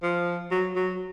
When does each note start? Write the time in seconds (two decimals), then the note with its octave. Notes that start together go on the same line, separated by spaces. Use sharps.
0.03 F3
0.51 F#3
0.76 F#3